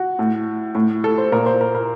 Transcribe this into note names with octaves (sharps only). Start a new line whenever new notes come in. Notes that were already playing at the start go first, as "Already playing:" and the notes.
Already playing: F#4
A2
A2
A4
C5
A#2 A#4
C5
A#4
A#4